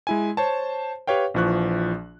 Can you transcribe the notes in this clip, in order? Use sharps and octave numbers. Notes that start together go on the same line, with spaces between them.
G#3 E4 G#5
C5 C#5 A5
G4 B4 C#5 F5 G5
A#1 E3 F3 C#6 F#6